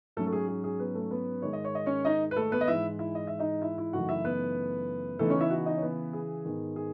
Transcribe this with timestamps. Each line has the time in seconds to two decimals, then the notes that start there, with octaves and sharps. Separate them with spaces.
0.17 G#2 F#3 A3 C#4 A4
0.27 A4
0.33 G#4
0.48 G#4
0.64 G#4
0.80 B3 B4
0.95 A3 A4
1.11 B3 B4
1.42 G#2 D#3 G#3 C#5
1.53 D#5
1.64 C#5
1.75 D#5
1.86 C#4 C#5
2.05 D#4 D#5
2.31 B4
2.36 A3 A4
2.52 B3 B4
2.61 D#5
2.68 G#2 E3 G#3 E4 E5
2.99 E4 E5
3.15 D#5
3.27 E5
3.39 D#4 D#5
3.62 E4 E5
3.78 E4 E5
3.93 F#2 C#3 E3 A3 D#4 F#4 F#5
4.09 E4 E5
4.24 B3 B4
5.19 C#3 E3 A3 B3 D#4 A4
5.30 C#4 C#5
5.40 E4 E5
5.50 F#4 F#5
5.66 D#4 D#5
5.77 C#5
5.82 B3 B4
6.13 G#4
6.45 G#2 D#3 G#3 B3 D#4
6.76 G#4